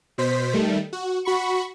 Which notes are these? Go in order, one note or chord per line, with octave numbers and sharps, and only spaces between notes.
B2 C5 B6
D#3 G3 A3
F#4
F#4 B5 C#6